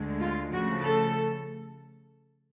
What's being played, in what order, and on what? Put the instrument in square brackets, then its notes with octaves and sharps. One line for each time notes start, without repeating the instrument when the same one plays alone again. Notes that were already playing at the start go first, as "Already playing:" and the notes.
Already playing: [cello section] D2 D3 G#3
F4
C#3 F3 A3 F#4
A4